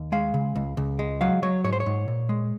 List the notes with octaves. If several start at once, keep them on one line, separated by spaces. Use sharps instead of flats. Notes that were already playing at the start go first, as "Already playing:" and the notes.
Already playing: D#2
G#3 F5
C#3
C#2
C#2
G#3
F#3 F5
F#3 C#5
G#2 C#5
C5
C#5
G#2
A#2
G#3